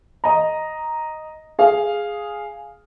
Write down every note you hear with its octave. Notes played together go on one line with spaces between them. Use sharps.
D#5 A#5
G#4 F5